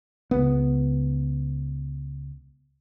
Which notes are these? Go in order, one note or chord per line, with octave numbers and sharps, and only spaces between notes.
C#2 B3